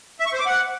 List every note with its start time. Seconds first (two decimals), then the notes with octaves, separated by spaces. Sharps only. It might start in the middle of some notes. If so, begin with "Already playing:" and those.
0.20 E5
0.26 C#6
0.33 C5
0.40 D6
0.46 F#5